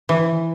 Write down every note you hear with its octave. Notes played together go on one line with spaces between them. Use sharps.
E3